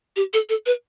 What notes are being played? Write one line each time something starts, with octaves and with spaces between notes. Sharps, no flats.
G4
A4
A4
B4